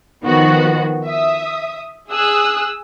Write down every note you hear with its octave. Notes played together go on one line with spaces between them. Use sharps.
D#3 F3 B3 F#4
E5 D#6
G#4 D#6 E6 F#6